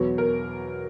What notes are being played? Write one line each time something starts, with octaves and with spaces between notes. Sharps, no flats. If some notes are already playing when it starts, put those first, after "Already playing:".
Already playing: E2 B2 F#3
A#4